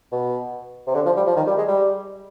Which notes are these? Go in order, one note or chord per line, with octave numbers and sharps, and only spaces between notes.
B2
C3
D3
F3
G3
F3
D#3
G3
G#3
G3